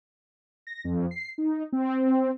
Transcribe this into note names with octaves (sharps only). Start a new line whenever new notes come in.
A#6
F2
C7
D#4
C4